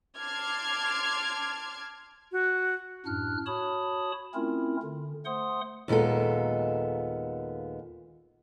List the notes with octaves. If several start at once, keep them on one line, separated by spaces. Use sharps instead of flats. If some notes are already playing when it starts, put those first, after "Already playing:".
A5 C6 D6 F6 G#6
F#4
F#2 A2 D4 F6 F#6
F#4 C#5 A5 B5 D#6
A3 C4 C#4 E4 F4 A#4
D3
A3 C5 F#5 C6 D#6
D#2 A#2 G#3 B3 A4